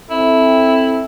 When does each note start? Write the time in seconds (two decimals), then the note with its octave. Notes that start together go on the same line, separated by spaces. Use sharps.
0.10 C4 E4 A4